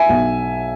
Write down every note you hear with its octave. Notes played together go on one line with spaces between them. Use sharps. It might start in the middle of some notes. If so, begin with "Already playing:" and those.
Already playing: E5 G#5
B1